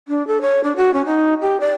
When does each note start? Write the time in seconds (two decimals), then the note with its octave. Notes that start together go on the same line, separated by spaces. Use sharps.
0.08 D4
0.27 A4
0.41 C#5
0.64 D4
0.76 F#4
0.94 C#4
1.06 D#4
1.41 G4
1.60 D5